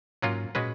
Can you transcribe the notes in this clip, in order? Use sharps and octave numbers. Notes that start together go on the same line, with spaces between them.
G#2 F#3 A#3 C#4 F4
A#2 G#3 C#4 F#4 B4